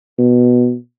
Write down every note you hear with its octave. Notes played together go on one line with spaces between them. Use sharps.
B2